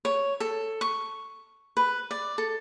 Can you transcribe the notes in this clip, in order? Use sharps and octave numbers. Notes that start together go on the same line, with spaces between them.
C#5
A4
C#6
B4
D5
A4